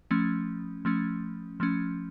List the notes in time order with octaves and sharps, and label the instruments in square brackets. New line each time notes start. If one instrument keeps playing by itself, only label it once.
[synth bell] F3 A3 C#4
F3 A3 C#4
F3 A3 C#4